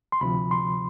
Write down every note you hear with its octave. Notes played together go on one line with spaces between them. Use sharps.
C6
D2 C3 F3 B5
C6